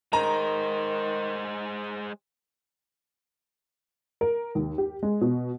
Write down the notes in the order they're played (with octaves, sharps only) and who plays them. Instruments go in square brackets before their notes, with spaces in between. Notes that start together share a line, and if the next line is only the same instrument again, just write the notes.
[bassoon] D#3 [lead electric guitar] G#3 C5 [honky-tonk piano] A#5
[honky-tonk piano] A#4
D#2
G4
G#3
B2